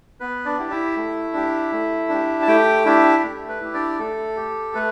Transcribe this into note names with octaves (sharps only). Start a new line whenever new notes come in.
B3 B4
D4 D5
E4 G4
E4 E5
A3
D4 G4
A3
D4 G4
A5
A3 G4 G5
D4 E4 G4 E5
A3
B4
E4 G4
D4 D5
A3 A4
G4
A3 B4